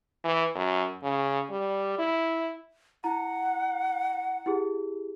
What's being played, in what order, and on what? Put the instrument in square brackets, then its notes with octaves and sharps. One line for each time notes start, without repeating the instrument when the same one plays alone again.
[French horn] E3
F#2
C#3
G3
E4
[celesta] E4 A#5 [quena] F#5
[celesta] E4 G4 G#4